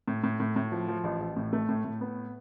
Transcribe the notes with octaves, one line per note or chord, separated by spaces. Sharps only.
A2
A2
A2
A2
F3
F3
A1
A1
A2
A3
A2
A2
B3